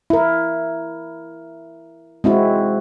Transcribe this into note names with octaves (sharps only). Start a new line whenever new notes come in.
E4 A#4
G#3 C4 E4 F#4